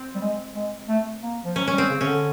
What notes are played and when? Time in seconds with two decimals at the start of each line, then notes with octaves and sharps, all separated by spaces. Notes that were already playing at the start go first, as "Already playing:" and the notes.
Already playing: C4
0.15 G3
0.22 G#3
0.55 G#3
0.89 A3
1.23 A#3
1.45 F3
1.56 F#3 C#4
1.68 C#4
1.73 G3
1.78 C4
1.90 C#3
2.01 C#3 C#4
2.07 D3